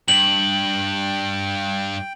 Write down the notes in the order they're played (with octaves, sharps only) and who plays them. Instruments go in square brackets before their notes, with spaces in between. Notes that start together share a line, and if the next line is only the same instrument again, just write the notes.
[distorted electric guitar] G2 [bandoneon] G5 [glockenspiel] F#7